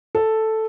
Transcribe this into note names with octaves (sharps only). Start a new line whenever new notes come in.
A4